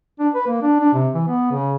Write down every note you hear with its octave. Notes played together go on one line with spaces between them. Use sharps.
D4
B4
A#3
D4
D4
C3
E3
B3
C#3